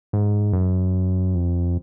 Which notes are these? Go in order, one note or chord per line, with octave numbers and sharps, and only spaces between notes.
G#2
F#2
F2